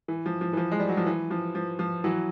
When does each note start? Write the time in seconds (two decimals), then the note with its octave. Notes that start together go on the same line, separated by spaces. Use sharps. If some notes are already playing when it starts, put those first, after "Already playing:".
0.08 E3
0.26 F3
0.41 F3
0.53 E3
0.57 F3
0.71 G#3
0.80 G3
0.89 F#3
0.97 F3
1.06 E3
1.31 F3
1.55 F3
1.79 F3
2.04 E3 F#3